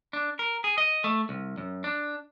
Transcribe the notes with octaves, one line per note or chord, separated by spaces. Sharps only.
D4
A#4
G#4
D#5
A3
C2
F#2
D4